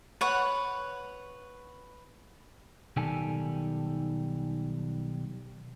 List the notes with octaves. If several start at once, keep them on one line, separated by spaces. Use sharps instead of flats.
B4 C#5 F#5
B1 D#3 G3 G4 A4 G#5